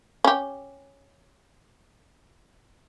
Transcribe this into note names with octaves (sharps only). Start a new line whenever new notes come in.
C#4 G4